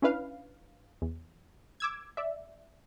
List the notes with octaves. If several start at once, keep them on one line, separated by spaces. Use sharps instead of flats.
C#4 D4 E4 B4 F5
E2
D6 E6 G#6
D5 E5